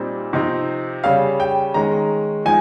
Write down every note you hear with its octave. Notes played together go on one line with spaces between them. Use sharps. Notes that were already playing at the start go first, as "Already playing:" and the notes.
Already playing: A#2 G3 C4 D#4
C3 F3 C4 D#4
C#3 G3 C#4 F5
G5
D#3 G#3 C#4 A#5
F3 G#3 D#4 G#5